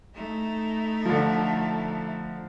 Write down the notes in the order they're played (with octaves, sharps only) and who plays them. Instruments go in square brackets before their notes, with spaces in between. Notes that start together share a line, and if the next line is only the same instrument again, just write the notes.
[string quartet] A3 D#4 E4
[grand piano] D3 F3